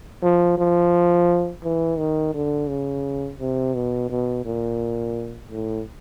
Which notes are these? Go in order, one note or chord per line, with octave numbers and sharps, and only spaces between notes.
F3
F3
E3
D#3
D3
C#3
C3
B2
B2
A#2
A2